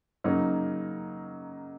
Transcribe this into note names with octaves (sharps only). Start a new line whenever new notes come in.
C#3 F#3 A#3 D#4